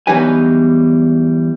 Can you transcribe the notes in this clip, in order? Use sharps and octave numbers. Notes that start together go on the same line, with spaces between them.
E2 F#3 G3 D#4 B4 G#5